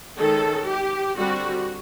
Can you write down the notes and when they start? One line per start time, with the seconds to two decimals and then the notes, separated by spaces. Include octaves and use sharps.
0.19 D#3 G#3 C#4 A4
0.68 G4
1.17 D3 G3 C4 F#4